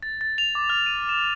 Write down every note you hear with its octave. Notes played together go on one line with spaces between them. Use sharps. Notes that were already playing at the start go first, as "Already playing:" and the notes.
A6
A6
F7
D6
F6
D#7
E7